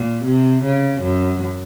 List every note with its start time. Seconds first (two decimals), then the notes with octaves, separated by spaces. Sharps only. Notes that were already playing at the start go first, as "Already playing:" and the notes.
Already playing: A#2
0.25 C3
0.63 C#3
1.01 F#2